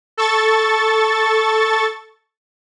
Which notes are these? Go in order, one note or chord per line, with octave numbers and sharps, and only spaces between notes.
A4 C#6 A6